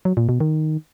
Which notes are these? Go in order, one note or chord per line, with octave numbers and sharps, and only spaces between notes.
F#3
A#2
B2
D#3